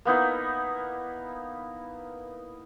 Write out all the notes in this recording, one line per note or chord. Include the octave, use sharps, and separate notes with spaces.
A#3 B3 D#4 E4